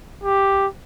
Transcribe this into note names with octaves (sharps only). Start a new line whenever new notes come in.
G4